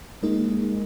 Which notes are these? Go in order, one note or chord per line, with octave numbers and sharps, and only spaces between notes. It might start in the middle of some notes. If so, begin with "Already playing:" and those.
G#3 A#3 D#4 A#4
G#3